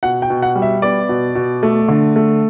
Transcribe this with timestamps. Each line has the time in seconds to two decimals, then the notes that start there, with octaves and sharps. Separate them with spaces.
0.03 B2 F#5
0.22 G5
0.30 B2
0.42 F#5
0.55 G3
0.62 E5
0.82 B3 D5
1.09 B2
1.35 B2
1.63 A3
1.88 D3
2.16 A3